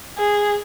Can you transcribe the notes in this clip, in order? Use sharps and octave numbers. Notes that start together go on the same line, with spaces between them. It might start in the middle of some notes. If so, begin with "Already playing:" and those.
G#4